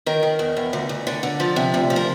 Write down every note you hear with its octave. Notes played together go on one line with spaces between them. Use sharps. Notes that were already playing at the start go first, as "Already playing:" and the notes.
D#3 A#4
D#3
E2
E2
D2
D2
D3
D3
F3
C3
D2
F3
A#4